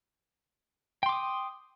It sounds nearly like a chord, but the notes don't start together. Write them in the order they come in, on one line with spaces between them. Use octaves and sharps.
G5 C6 D6 D#6